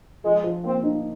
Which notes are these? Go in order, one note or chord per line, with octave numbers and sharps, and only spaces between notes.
F3 G#3
F3
A#3 C4
D#4